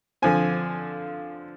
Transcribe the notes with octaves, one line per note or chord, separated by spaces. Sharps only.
D3 F3 C4 G#5